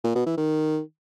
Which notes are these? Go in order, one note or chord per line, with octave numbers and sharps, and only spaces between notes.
A#2
B2
E3
D#3